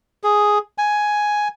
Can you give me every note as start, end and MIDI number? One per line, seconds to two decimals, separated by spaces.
0.23 0.58 68
0.78 1.48 80